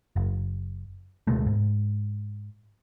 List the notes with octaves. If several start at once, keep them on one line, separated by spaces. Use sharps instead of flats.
F#1
D2 B2 G#3 A3
G#2